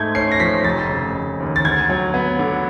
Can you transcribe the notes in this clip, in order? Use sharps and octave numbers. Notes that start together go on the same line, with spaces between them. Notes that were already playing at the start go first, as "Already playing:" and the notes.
Already playing: G#2 A3 G6 G#6
C#4 C7
A#6
F3 B6
F1 A6
C#3
F1
D#2
A6
D2 G#6
F#3
B3
D3